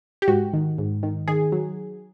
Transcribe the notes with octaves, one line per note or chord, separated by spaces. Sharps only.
G4
G#2 F#4
D#3
G#2
D#3
D#3 G#4
F#3